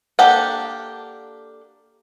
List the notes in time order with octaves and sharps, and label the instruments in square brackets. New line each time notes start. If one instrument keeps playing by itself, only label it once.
[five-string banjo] A#3 D4 G4 A4 F#5